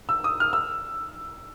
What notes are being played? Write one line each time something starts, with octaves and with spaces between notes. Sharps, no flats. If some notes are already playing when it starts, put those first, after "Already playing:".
E6
D#6
F6
E6